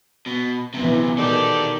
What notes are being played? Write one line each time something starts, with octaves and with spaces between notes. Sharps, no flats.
B2
F#2 C3 E3 B3
B2 D#3 G4 A4 D5